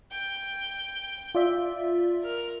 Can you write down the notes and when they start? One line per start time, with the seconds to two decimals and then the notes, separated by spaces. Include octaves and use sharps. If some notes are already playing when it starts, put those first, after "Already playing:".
0.12 G5
1.35 F4 D5 E5
2.23 A#4 F6